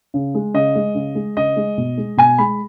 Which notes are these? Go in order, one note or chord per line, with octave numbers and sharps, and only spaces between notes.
C#3
G#3
C#3 D#5
G#3
C#3
G#3
C#3 D#5
G#3
B2
G#3
B2 G#5
G#3 B5